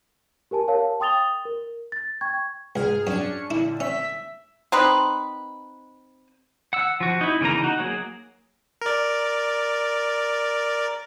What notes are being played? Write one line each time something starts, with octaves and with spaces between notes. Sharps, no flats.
G4 A#4 G#5 A5
A#4 C#5 F5 A5
G5 C6 D#6 A6 F7 G7
A#4
A6
G5 C#6 G#6
C#2 G#2 G#4 F6
F#2 C#4 D4 C#7
A#2 D3 E4
C#4 E5 B6
C4 D#4 B4
F#5 E6
F3 F#4
D#4 E4
C#3 E3 A#3 D#4 A#5
D#4 F#4
F#3 A#3 G#4
A#4 D5